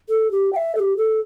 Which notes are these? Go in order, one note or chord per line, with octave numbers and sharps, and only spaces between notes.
A4
G4
G5
E5
A4
G4
A4